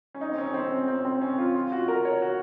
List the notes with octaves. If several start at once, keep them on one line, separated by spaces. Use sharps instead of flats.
C#4
D#4
C4
C#4
C4
C#4
C4
C4
C#4
F4
F4
F#4
A#4
C#5
F#4